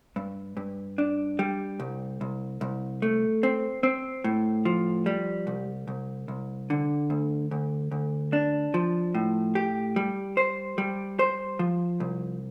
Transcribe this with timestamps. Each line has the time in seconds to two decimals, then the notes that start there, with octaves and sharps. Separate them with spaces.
0.16 G2
0.57 G2
0.98 D4
1.39 G3
1.80 C2
2.21 C2
2.61 C2
3.02 A3
3.43 C4
3.83 C4
4.24 A2
4.65 F3
5.06 G3
5.47 C2
5.88 C2
6.28 C2
6.70 D3
7.10 D2
7.51 D2
7.92 D2
8.33 D4
8.74 F3
9.15 A2
9.55 G4
9.96 G3
10.37 C5
10.78 G3
11.19 C5
11.59 F3
12.00 C2